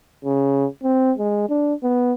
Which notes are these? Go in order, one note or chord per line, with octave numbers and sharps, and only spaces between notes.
C#3
C4
G#3
D4
B3